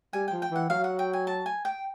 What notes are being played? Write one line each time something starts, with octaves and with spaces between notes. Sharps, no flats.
G3 G#5
F3 G5
G5
E3 F#5
F#3 F5
F#5
G5
G#5
A5
G#5
G5